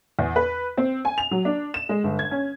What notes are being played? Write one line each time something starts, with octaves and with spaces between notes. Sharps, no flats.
E2
B4
C4
G#5
F7
F#3
D4
E7
G#3
G1
G#6
C#4